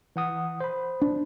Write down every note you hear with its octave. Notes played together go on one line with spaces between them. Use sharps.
E3 F#5 D#6
C5 B5
D4